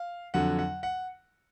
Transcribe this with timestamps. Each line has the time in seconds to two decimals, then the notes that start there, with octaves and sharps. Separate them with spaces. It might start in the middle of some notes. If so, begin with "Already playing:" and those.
Already playing: F5
0.34 F2 D3 F#3 F#5
0.59 F#5
0.83 F#5